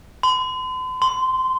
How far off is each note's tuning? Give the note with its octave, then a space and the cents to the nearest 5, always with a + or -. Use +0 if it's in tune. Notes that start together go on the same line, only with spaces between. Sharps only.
C6 -45
C6 -15